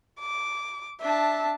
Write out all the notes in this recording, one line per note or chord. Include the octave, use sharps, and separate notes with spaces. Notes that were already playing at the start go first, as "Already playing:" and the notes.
D6
D4 E5 A5